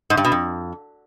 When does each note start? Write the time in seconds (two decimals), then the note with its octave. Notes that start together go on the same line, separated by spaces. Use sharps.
0.10 G#2
0.17 G2
0.25 B2
0.32 F2